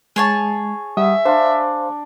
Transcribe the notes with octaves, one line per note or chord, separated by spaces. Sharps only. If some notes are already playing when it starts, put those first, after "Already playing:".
G#3 G#4 C#5 A5
G3 E5 F#5 D#6
D4 C5 F5 C6